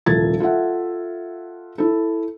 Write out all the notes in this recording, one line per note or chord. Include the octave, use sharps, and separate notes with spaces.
D#1 C2 F3 A4 G#6 A6
F4 A4 E5 F#5
E4 A4